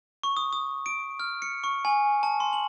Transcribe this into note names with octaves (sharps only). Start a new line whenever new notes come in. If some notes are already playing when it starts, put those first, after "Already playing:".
C#6
D#6
D#6
D7
F6
C#7
C#6
G#5
A5
C6
F#7